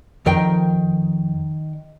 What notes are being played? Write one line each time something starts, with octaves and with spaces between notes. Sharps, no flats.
F2 D#3 A#4 G5